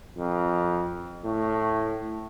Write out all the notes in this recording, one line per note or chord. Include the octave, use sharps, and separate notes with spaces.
F2
A2